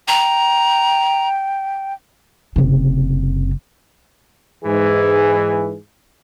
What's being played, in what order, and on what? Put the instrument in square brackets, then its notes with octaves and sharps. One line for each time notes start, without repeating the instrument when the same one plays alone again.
[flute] G5 [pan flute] A#5
[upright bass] F#1 C3
[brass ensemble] G#2 E3 G#4